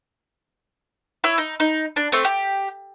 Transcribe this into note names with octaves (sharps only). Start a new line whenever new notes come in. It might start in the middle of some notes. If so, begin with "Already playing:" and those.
E4 C#5 E6
D#4
D#4
D4
A3 C4
G4